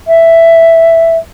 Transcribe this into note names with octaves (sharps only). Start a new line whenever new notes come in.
E5